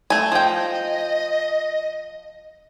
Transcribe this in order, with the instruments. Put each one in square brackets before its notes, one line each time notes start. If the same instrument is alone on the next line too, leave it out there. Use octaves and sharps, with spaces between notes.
[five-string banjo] A3 G#5
[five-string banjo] F3 G5 [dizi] D#5